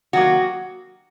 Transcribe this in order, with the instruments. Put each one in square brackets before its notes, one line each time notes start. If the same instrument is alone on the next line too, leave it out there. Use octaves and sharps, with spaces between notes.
[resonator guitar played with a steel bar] D#3 F#3 A#3 F#4